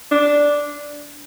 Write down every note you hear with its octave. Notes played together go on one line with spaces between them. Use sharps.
D4